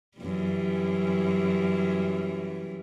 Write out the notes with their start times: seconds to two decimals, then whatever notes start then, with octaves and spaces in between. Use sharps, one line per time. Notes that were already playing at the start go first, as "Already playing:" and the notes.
0.18 F#2 E3 G3